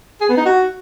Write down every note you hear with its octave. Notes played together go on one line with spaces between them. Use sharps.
G#4
B3
D#4
F#4